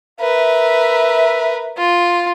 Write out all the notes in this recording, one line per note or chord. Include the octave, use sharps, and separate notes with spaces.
A#4 B4 E5
F4